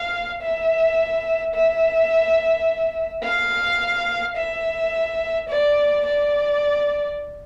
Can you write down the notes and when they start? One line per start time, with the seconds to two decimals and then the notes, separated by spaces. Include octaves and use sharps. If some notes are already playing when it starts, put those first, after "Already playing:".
Already playing: F5
0.42 E5
1.54 E5
3.23 F5
4.37 E5
5.49 D5
6.06 D5